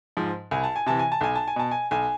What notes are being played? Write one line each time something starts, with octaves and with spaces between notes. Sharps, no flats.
G#2 F3
C2 G#5
A5
G#5
C3 E3 A5
G#5
A5
B1 G#5
A5
G#5
B2 A5
G#5
B1 G#5